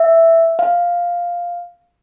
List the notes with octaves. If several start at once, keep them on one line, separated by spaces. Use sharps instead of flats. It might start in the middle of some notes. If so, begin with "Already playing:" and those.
Already playing: E5
F5